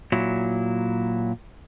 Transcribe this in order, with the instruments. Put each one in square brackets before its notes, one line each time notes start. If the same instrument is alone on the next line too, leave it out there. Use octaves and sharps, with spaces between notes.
[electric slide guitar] A#2 F#3 E4